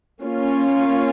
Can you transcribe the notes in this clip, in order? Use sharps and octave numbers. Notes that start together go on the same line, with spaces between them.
A#3 C#4 F4